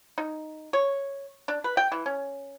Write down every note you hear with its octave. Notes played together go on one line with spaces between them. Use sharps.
D#4
C#5
D4
B4
G5
E3
C#4